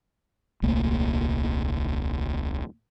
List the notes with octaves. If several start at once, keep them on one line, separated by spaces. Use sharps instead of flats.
D#1 C2 A3 A#3